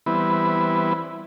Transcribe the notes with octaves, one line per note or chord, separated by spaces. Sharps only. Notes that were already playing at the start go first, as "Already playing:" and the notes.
E3 G3 B3 C4 E4 B4